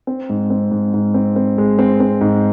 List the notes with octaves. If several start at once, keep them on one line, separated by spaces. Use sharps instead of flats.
C4
G#2
C4
G#2
G#2
C4
C4
G#3
C4
C4
G#2